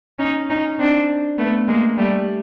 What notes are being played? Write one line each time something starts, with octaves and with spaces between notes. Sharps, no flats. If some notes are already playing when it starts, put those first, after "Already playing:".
C#4 D#4
C#4 D#4
C4 D4
A3 B3
G#3 A#3
G3 A3